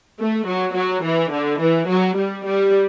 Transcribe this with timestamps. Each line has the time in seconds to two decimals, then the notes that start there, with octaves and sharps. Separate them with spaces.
0.20 A3
0.47 F#3
0.76 F#3
1.04 E3
1.33 D3
1.61 E3
1.88 F#3
2.16 G3
2.45 G3